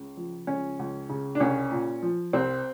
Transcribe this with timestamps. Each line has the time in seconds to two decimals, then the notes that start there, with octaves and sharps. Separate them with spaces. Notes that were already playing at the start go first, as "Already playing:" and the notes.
Already playing: C#2 C#3
0.17 F3
0.47 C#2 C#4
0.79 C#2
1.09 C#3
1.35 D4
1.40 C2 C#4
1.71 A#2
2.03 F3
2.33 C2 C4